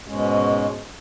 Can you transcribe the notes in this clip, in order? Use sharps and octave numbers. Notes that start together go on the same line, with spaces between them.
G#2 B2 G#3 C#4